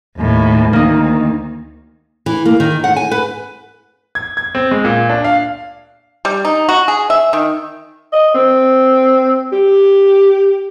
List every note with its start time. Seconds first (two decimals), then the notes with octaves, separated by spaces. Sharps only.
0.18 D#2 A2
0.73 D2 D#3 A#3 D#4
2.26 E3
2.45 A#3
2.60 D#3
2.84 F#5
2.96 G#5
3.11 B4
4.15 G#6
4.37 G#6
4.55 C4
4.71 G#3
4.85 A#2
5.09 D4
5.24 F5
6.25 G3
6.45 D#4
6.69 F#4
6.88 G#4
7.10 E5
7.33 D#3
8.13 D#5
8.34 C4
9.52 G4